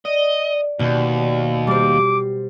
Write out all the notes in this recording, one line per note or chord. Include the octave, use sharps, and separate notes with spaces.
D5 D#5
D#2 B2
G3 C5 D6